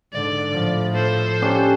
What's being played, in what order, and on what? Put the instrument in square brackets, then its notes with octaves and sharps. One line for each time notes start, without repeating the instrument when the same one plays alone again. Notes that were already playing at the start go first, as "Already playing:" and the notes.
[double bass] G#2 D3 [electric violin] D5
[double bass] A2 F3
[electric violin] A4 C5
[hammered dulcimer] C#4 D4 G4